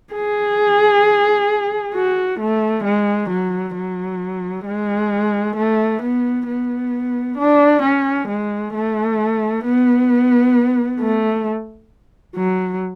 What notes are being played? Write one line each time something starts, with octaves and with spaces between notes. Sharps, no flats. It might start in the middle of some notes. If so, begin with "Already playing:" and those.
G#4
F#4
A3
G#3
F#3
F#3
G#3
A3
B3
B3
D4
C#4
G#3
A3
B3
A3
F#3